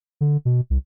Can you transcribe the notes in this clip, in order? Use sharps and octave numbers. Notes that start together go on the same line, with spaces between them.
D3
B2
C2